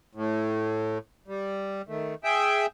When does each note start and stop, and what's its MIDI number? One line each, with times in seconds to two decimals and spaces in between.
0.15 0.98 45
1.28 1.82 55
1.89 2.15 51
1.89 2.15 57
2.24 2.66 68
2.24 2.66 76
2.24 2.66 79